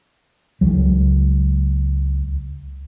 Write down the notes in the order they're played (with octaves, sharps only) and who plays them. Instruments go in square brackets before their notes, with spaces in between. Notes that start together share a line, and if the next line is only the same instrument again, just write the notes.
[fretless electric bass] C#2 F#3